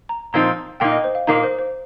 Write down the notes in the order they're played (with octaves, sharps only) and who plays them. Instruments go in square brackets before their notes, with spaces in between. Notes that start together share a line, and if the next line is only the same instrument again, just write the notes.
[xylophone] A#5
[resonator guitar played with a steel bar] A#2 F3 C4 D#4 [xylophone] A#5
[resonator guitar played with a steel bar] A#2 A#3 D#4 [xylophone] G5
[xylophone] D#5
C5
F5
[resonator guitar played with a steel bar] A#2 A#3 D#4 [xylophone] A#5
[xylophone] C5
C5